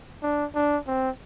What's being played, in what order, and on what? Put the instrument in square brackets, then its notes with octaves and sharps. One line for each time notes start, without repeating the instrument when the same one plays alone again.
[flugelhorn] D4
D4
C4